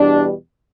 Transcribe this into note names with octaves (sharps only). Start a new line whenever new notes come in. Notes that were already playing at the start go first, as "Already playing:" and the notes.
Already playing: E2 B2 G3 D4